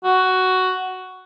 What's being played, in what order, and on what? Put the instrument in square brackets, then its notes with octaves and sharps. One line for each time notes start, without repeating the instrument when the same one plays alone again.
[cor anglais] F#4